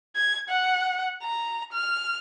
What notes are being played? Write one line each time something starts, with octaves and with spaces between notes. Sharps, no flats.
G#6
F#5
A#5
F6